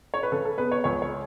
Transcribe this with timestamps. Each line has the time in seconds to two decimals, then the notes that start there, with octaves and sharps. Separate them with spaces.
0.14 C#5
0.23 B4
0.32 C#3 A4
0.45 A4
0.58 B3 B4
0.72 C#5
0.84 C#2 C#5
1.02 C#5